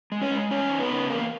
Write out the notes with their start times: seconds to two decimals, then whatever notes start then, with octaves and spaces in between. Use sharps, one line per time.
0.12 G#3
0.22 C#4 C#5
0.31 G#3
0.51 E2 C#4 C#5
0.70 D#4
0.80 B3 B4
0.89 C#3
1.09 E2 A#3 A#4